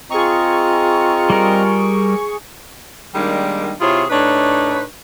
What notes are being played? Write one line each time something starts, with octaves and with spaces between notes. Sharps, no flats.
C4 F4 G#4 D#5 A#5 C#6
G3 A#4
D#3 G3 G#3 A#3 D4 D#4
C3 E4 F4 G#4 C#5 E5
A2 D4 D#4 B4 C#5